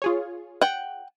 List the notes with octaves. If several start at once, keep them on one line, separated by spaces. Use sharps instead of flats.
F4 G#4 C#5
F#5 G5